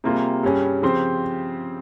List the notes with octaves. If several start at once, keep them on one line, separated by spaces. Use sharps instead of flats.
C3 G3 A#3 F4 G#4
G2 G3 C#4 G#4
C#3 F3 C4 G4 C5